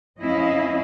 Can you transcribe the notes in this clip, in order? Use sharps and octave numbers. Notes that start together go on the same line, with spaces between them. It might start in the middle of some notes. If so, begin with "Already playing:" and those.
F2 C4 C#4 E4 D#5 F5